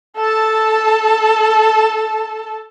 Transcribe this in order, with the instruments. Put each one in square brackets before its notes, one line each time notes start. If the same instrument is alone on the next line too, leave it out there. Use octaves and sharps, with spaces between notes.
[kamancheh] A4 A5